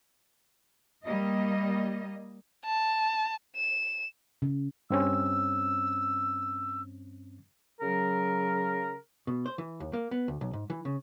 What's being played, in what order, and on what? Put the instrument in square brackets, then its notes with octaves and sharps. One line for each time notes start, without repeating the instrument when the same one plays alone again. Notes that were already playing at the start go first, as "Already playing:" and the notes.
[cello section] G3 A#3 D#5
[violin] A5
E7
[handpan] C#3
[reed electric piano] G2 C4 C#4 [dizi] E6
[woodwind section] C#3 F#3 A#4
[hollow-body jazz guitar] B2
C5
E3
D#2
A#3
B3
D2
B1
G#2
E3
C#3